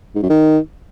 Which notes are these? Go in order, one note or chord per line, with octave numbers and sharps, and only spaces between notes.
G#2
F#2
D#3